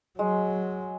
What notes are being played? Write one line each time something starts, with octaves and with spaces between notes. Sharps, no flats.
F#3 G#3